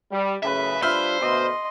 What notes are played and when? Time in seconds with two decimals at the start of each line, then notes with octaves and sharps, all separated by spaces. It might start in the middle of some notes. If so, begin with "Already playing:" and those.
0.10 G3
0.43 F#2 A2 C#3 B4 E5
0.82 G3 D4 F4 C5 E5 B5 F6
1.21 D2 B2 D#5 C6